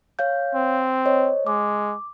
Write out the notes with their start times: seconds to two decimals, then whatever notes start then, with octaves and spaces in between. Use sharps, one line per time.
0.19 C#5 F5 G6
0.54 C4
1.06 C5 C#5 D#5
1.47 G#3 D6